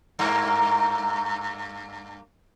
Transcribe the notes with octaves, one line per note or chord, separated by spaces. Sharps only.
G2 A#3